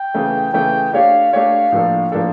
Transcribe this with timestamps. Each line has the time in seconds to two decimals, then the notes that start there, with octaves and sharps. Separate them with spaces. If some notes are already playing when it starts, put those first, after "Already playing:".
Already playing: G5
0.14 C#3 E3 A3
0.53 C#3 E3 A3 G5
0.93 A3 D4 G4 C#5 F5
1.33 A3 D4 G4 C#5 F5
1.72 A2 F3 A#3 D4 A4
2.12 A2 F3 A#3 D4 A4